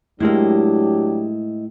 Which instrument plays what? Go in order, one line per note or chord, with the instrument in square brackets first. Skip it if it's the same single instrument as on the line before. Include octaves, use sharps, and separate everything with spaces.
[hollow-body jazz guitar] A2 G#3 A#3 [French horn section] F#3 D4 G4 [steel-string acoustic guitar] E4 D#5